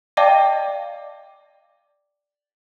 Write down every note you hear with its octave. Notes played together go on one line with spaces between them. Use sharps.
D5 D#5 F5 G5 A5 D6